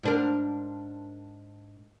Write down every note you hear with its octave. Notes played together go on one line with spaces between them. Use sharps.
G#2 D4 A#4